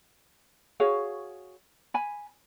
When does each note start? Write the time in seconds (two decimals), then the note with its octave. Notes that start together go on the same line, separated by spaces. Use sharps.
0.80 F#4 G#4 C#5 F5
1.94 G#5 B5